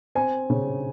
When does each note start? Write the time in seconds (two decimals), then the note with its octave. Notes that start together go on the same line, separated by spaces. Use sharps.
0.15 C4 G#5
0.50 C#3